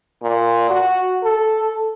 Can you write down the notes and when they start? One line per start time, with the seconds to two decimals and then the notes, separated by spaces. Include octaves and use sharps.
0.23 A#2
0.70 F#4
1.24 A4